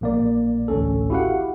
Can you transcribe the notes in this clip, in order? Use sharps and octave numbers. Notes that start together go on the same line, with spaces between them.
A#1 A#3 D5
A1 D2 C#4 A4
E4 F#4 G4 F5 F#5